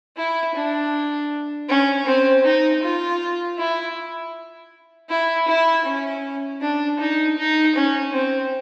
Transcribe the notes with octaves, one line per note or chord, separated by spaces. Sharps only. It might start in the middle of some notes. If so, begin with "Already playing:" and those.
E4
D4
C#4
C4
D#4
F4
E4
E4
E4
C#4
D4
D#4
D#4
C#4
C4